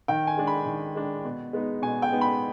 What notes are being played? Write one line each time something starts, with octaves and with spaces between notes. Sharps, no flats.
D#3 G5
G#5
G#3 D4
B5
D#3
G#3 D4
B2
G#3 B3 D#4
B2 G#5
G5
G#3 B3 D#4
B5